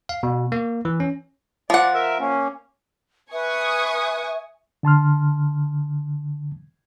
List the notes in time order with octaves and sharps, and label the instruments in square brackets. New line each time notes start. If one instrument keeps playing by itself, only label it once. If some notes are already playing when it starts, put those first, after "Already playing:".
[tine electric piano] F5
B2
A#3
E3
C#4
[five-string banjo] F3 F#5 [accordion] D5
[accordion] A#4 E5
A#3 C#4
[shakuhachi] B4 [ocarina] E5 [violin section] G#5 C#6 D#6
[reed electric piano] D3 A5 C6 F6